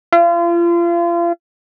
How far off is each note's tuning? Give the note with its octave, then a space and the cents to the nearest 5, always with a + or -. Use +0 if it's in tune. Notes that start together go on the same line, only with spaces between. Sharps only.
F4 -35